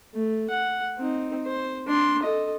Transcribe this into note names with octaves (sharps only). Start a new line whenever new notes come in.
A3
F#5
C4 D#4
C5
D4 C6
A4 D#5